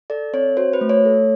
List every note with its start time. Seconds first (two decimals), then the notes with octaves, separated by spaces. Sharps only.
0.10 A4 D5
0.33 C4 C#5
0.57 F#4 C5
0.73 B4
0.81 A3
0.89 C#5
1.05 A4